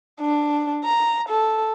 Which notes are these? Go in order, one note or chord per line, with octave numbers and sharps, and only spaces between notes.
D4
A#5
A4